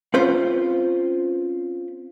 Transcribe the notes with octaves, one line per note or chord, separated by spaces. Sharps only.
C4 C#4 F4 B4 C5